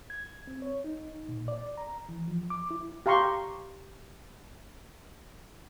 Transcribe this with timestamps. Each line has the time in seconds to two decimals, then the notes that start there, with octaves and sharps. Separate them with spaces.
0.10 G#6
0.47 C4
0.62 C#5
0.84 D#4
1.29 A#2
1.48 D5
1.77 A#5
2.09 E3
2.28 F3
2.50 D6
2.71 E4
3.06 G4 F5 A#5 C6 C#6